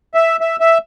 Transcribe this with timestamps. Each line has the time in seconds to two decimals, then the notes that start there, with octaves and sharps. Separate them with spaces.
0.14 E5
0.41 E5
0.60 E5